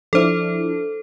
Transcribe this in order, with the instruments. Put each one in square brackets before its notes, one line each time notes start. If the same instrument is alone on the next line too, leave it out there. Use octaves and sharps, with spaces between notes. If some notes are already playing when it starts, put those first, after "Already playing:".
[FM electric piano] F3 D4 E4 [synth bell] A4 C5